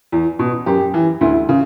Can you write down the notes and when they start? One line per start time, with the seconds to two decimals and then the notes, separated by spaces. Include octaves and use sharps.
0.12 E2
0.39 B2
0.66 F#2 G4
0.94 E3
1.21 D2 E4
1.49 C#3